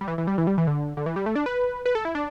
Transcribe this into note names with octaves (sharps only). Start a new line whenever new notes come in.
G3
E3
E3
G3
E3
G3
E3
D3
D3
E3
G3
A3
D4
B4
B4
A4
E4
D4